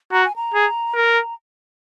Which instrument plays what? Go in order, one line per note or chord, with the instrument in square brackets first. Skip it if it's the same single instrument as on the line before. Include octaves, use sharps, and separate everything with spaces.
[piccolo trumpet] F#4 [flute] A#5
[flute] G#5
A#5
[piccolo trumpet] G#4
A#4